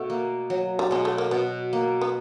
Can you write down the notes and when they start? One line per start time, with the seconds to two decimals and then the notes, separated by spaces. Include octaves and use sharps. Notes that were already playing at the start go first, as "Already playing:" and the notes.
Already playing: B2 A3
0.10 A#3
0.50 F#3
0.79 G3
0.91 B2 G#3
1.05 A3
1.18 A#3
1.31 B2 B3
1.73 A#3
2.01 B3